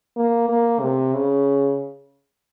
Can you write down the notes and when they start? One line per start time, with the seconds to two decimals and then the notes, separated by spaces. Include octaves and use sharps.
0.16 A#3
0.49 A#3
0.80 C3
1.13 C#3